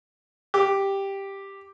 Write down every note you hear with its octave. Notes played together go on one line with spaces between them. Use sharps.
G4